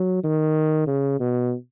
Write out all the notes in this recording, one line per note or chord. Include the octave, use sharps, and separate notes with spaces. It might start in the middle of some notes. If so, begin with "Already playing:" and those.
Already playing: F#3
D#3
C#3
B2